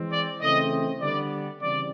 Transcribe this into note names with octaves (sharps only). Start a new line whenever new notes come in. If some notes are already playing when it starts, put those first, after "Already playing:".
Already playing: E3 G#3 C4
D5
C#3 E3 A3 C4 D#5
D3 G3 B3 D5
C#3 E3 G3 C4 D5